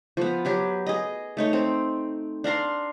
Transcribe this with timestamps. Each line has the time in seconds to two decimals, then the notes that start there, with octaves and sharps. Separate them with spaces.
0.17 F3 B3
0.45 F#3 G4 B4
0.86 G#4 D#5
1.37 A3 D#4 C#5
1.53 C4
2.44 D4 F5 A#5 C6